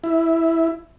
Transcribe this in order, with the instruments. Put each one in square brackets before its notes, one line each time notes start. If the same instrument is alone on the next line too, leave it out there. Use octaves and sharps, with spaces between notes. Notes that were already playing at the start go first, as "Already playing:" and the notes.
[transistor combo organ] E4